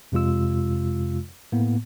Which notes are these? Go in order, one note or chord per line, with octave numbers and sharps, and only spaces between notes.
F2 C3 G#3 F4 E6
A2 A#3 B3